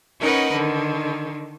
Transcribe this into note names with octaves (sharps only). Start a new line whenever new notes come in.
C#4 D#4 A#4 B4 D#5 F#5
D3 D#3